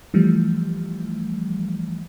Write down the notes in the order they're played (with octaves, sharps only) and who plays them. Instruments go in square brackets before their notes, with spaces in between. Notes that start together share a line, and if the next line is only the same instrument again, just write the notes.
[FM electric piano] E3 F3 G3 A3